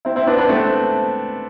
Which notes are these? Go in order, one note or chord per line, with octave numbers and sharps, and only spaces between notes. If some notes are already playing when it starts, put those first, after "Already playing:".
C4 E4
C4 E4
B3 D4
B3 D4
A3 C4